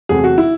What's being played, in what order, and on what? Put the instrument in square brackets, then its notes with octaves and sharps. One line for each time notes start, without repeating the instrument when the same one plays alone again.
[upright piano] E2 C3 F#3 A3 G#4
F#4
E4